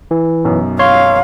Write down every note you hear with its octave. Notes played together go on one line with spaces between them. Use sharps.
E3
B1 F#2
C#5 F5 C6